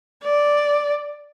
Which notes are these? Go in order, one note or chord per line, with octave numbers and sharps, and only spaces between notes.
D5